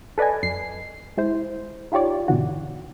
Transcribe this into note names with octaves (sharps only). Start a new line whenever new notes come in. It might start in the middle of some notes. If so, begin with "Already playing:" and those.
A4 B4 D5 D#5 G#5
F#2 C7
G#3 E4 C5
D#4 F4 G4 C#5 D5
G2 B2 D3 E3 F#4